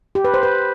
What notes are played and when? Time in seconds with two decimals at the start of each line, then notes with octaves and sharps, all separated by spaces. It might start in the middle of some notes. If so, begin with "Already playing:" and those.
0.15 G4
0.24 B4
0.34 C5
0.43 B4